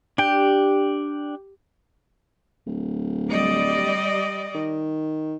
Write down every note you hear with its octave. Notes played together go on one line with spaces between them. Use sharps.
D4 G4 G5
D1
G3 D5 D#5
D#3